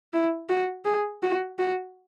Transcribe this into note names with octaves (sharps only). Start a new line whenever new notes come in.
E4
F#4
G#4
F#4
F#4